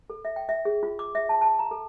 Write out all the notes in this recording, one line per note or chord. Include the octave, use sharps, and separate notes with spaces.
A4
E5
G5
E5
G#4
F4
D6
E5
A5
A5
A#5
A4